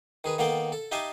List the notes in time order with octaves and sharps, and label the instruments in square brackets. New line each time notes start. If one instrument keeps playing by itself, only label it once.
[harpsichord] D#3 G#4 B4
D#3 A#3 B3 A4 F5 G5
A4
D#4 G4 E5 F5 G#5 A5